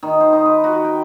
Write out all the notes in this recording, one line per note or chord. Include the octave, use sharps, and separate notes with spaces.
D#3
C5
D#4
B4
F#4
G5